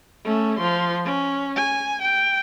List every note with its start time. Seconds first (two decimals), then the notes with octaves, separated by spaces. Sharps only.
0.25 A3 C#4
0.60 F3 C6
1.05 C#4
1.56 G#5
2.02 G5